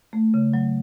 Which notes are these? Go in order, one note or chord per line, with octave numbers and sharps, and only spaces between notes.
A3
C#3
F#3